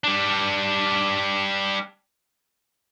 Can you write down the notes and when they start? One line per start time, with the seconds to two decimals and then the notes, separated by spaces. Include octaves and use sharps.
0.04 G3 D4